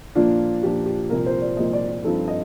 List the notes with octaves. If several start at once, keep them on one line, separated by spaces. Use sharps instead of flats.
A#2 F3 A#3 D4 F4
A#2 F3 A#3 D4 G4
G4
C2 A#2 F3 A#3 A#4
C5
D5
C2 A#2 F3 A#3 D#5
D5
D5
G2 F3 C4 D#4 A4
D#5